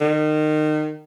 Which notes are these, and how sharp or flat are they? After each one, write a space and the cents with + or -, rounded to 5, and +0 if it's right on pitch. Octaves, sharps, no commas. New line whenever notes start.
D#3 -25